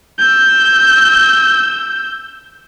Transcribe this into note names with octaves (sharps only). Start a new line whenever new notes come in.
E6 G6